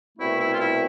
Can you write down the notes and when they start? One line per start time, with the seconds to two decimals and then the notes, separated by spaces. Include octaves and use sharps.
0.18 C2 B2 A3 C4 E4
0.38 E4
0.52 F4
0.58 E4